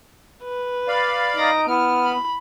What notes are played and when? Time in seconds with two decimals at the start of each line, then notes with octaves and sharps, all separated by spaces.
0.43 B4
0.88 D5 F5 B5
1.36 D#4 A#6 D7
1.68 B3 E4 F6
2.05 B5